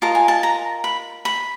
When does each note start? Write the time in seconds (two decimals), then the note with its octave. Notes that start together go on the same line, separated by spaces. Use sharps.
0.02 F4 A#4 D#5 A5
0.15 G#5
0.28 A5
0.43 A#5
0.84 B5
1.25 B5